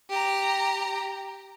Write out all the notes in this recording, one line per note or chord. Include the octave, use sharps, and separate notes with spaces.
G4 A#5